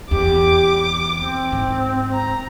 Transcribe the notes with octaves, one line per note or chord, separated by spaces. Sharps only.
E2 G4 D6
C4
G#2
A#5